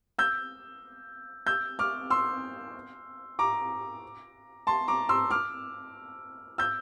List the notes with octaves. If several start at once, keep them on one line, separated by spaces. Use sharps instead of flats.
E6 G6
E6 G6
D6 F6
C6 E6
A#5 D6
A5 C6
A#5 D6
C6 E6
D6 F6
E6 G6